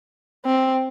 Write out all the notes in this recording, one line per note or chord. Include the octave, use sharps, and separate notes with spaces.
C4